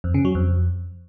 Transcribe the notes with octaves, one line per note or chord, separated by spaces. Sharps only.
F2
C#3
F#3
F2